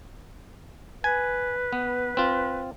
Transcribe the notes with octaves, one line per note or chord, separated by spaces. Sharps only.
B4 G#5
B3
C4 F4